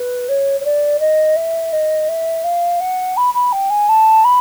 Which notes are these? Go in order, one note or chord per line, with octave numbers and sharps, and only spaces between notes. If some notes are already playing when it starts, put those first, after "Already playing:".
Already playing: B4
C#5
C#5
D5
D#5
E5
D#5
E5
F5
F#5
B5
B5
G5
G#5
A5
B5